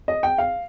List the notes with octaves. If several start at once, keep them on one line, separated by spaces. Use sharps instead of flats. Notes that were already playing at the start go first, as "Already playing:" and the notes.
D#5
G5
F5